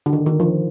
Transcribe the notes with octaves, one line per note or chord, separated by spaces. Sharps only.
D3
D#3
D#3
F3